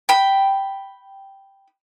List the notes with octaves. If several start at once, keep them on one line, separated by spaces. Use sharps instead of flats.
G5 B5